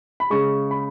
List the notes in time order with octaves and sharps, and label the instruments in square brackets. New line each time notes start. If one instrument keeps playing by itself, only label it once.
[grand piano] B5
C#3 G#3 C#6
B5